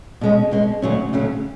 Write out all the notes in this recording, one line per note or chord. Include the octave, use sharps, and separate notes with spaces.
B2 G#3 C#4
B2 G#3 C#4
D2 C#3 F#3 C#4
D2 C#3 F#3 C#4